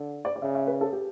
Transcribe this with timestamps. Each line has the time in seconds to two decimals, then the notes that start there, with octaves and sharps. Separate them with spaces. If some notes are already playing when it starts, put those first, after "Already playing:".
Already playing: D3
0.25 D5
0.36 D5
0.42 C#3 E5
0.55 E5
0.67 B4
0.81 A4
0.93 G4